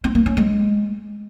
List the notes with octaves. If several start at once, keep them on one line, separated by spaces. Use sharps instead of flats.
C4
A#3
C#4
G#3